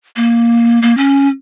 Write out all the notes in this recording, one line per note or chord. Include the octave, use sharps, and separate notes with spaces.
A#3
A#3
C#4